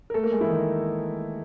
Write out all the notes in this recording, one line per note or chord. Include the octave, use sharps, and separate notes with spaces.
A#4
A3 A4
A#3 A#4
G#3 G#4
E3 E4
D#3 D#4